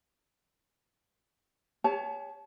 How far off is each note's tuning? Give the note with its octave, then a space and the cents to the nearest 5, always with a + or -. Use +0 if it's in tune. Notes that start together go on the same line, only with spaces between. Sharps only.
G4 +45 C#5 +20 A5 -25